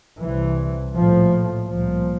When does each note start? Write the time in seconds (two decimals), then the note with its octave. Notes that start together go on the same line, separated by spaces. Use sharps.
0.20 C2 C3 E3
0.93 A#1 A2 F3
1.68 C2 A#2 F3